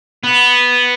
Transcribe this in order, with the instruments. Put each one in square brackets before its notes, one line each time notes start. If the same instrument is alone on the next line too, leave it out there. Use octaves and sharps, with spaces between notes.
[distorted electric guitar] B3